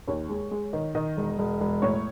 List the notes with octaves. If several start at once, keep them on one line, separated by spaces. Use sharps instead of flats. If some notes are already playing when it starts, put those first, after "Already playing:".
D#2 C#5
G#3
G#3
D#3
D#3 D#5
E1
E1
E1
A2 C#5